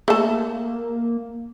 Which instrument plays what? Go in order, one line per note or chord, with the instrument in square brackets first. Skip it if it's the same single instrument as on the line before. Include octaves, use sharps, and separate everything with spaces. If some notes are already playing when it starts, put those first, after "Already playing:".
[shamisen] A3 A4 [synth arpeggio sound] A#3